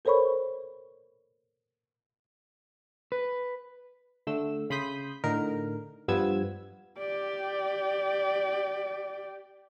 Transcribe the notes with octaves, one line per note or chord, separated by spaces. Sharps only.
A4 A#4 C5 C#5 B5 C#6
B4
D3 A3 E6
C#3 B5 C6 D#6 G6 B6
A2 D3 D#4 A#4
G2 F3 B3 E6 G#6
G4 D5